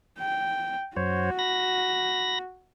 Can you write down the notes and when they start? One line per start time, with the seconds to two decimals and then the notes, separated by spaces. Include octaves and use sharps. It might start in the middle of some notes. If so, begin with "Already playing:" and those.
0.19 G5
0.97 F#2 F#4 C5 C#5
1.39 B5 A#6